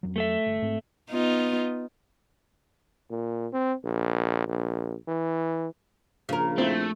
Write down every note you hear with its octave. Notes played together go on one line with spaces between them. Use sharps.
F2 F#3
A3 A4 E5
G1
G#2 C4
B3 D#4 F4
A#2
C4
A#1
A#1
E3
A#1 C#3 A#4
A3 C4 E4